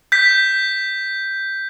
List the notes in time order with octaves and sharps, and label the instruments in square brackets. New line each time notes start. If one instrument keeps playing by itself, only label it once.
[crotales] G6 B6